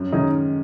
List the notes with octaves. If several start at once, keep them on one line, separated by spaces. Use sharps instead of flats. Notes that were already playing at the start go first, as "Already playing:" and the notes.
Already playing: F#2
D#3 G#3 C#4 D#4